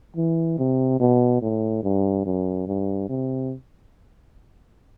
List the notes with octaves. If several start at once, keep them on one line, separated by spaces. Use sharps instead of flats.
E3
C3
B2
A2
G2
F#2
G2
C3